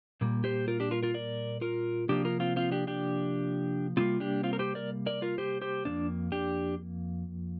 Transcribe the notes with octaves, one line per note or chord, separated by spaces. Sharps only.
A#2 G3 A#3
G4 C5
F4 A#4
D4 G4
F4 A#4
F4 A#4
A#4 D5
F4 A#4
C3 F3 A#3 D4 G4
F4 A#4
C4 F4
C4 F4
D4 G4
D4 G4
C3 G3 A#3 C4 F4
D4 G4
C4 F4
A#4
G4 C5
A#4 D5
A#4 D5
F4 A#4
G4 C5
G4 C5
F2 C3 A#3 D4
D4 G4